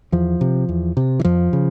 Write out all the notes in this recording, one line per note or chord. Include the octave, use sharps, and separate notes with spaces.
E2 F3
C3
E2
C3
E3
F2 F3
C#3